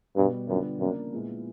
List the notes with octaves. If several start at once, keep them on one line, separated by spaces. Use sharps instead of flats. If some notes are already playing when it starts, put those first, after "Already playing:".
G2 B2 G3 B3
F#2 D3 G3 B3 D4 F4
F#2 C#3 F3 A#3 D4
A#2 F3 G#3 B3 E4